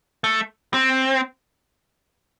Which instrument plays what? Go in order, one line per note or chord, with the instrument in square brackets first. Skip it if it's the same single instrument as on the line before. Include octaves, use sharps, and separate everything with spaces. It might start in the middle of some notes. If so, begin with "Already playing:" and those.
[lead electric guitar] A3
C4